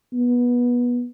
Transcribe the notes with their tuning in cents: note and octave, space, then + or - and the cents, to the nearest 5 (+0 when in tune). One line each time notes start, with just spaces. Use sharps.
B3 -20